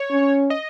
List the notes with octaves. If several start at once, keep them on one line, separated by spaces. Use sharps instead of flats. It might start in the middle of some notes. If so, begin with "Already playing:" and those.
Already playing: C#5
C#4
D#5